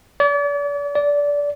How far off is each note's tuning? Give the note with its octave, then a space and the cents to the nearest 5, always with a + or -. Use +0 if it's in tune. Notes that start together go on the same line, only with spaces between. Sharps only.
D5 -40
D5 -20